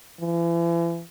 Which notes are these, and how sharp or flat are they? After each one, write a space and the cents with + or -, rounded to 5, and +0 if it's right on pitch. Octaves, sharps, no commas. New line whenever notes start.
E3 +40